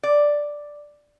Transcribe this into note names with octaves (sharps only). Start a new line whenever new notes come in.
D5